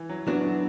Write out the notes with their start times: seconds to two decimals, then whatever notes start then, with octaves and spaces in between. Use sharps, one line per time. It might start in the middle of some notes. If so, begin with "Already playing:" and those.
Already playing: E3
0.09 F#3
0.26 E3 F#3 B3 D4 F#4
0.44 D3